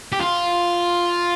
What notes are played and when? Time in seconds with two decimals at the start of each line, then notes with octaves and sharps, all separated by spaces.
0.12 G4
0.20 F4